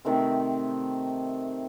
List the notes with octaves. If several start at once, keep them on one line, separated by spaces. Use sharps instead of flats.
C3 D#3 A3 C4